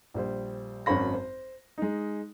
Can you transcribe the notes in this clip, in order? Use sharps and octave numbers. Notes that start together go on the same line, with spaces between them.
A#1 G3 C5
G#1 F#2 C5 C#5 B5 A#6
C5
G#3 D#4